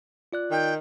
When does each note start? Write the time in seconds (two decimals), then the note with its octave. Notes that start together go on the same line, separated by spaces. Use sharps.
0.33 F4 D5 F#6
0.51 D#3 G5